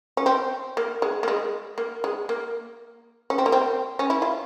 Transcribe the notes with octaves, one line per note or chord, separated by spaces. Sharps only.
C#4
C4
A#3
G#3
A#3
G#3
A#3
G#3
A#3
C#4
C4
A#3
C4
C#4
E4
F4